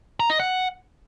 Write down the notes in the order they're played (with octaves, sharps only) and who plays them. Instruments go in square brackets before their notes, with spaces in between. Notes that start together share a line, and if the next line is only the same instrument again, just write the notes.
[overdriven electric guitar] A#5
D#5
F#5